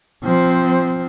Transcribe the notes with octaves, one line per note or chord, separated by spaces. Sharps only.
F3 C4